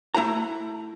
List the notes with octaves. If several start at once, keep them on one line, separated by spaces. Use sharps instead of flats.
A3 E4 F#5 A#5